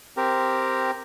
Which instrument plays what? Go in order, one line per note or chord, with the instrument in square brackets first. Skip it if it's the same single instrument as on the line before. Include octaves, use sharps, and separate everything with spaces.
[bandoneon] C4 G4 A#4